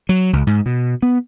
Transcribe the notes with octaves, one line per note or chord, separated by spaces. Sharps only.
F#3
C#2
G#2
B2
B3